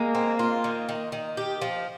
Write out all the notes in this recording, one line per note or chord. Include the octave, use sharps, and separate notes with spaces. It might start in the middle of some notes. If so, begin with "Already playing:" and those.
Already playing: G#3 A#3
C4
F4
D#3
D#3
D#3
G4
F3